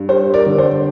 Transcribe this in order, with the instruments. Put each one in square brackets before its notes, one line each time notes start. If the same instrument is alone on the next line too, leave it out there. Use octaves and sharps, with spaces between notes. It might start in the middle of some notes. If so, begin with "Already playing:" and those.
Already playing: [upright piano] G2
G3 C5
A#4 D5
D3
C5